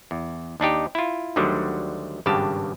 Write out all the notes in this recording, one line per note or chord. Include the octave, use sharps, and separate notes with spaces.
E2
D#2 D4 D#4 G4
E4 F4
D2 D3 D#3 F#3 G3
G#1 G2 C#3 G4 A5